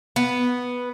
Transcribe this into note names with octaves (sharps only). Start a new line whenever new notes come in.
B3